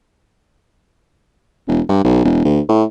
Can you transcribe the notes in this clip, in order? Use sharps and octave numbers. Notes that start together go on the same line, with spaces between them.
E1
G2
B1
E1
D2
A2